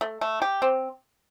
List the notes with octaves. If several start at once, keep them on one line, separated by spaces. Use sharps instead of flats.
A3
A3
G4
C4